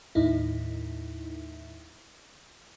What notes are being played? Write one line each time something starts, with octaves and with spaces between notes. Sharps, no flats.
D#2 A2 D#4 E4